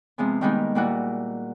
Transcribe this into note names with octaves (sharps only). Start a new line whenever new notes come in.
C3 F3 G#3 B3
D#3 G3 G#3 A#3 B3 D#4
A#2 G3 A#3 E4 F#4